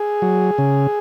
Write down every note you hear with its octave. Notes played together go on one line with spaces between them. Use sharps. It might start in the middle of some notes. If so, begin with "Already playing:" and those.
Already playing: G#4
F#3
C#3